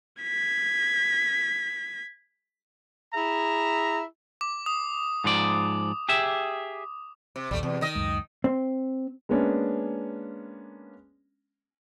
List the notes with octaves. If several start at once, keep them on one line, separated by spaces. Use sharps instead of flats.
G#6 B6
E4 G#4 E5 A#5
D6
D#6
G#2 F3 D5
G4 G#4 E5
C3
A#1 D#2 G3 A3
E2 C3
D#3 D#5
C#2 F#2 G#3
C4
G#3 A#3 B3 C#4 D4